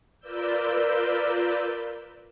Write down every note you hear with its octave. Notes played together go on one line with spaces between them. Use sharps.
F4 A#4 B4 D5 E6 G6